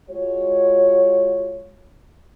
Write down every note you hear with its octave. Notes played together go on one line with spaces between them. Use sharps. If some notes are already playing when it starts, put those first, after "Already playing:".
G#3 F4 F#4 C#5